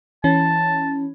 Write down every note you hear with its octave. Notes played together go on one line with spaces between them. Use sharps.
E3 C#4 A5